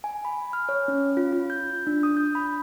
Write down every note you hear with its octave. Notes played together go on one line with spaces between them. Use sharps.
G#5
B5
F6
C#5
C#4
F4
F4
G6
D4
D#6
G6
B5